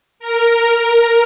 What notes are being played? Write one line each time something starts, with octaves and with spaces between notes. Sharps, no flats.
A#4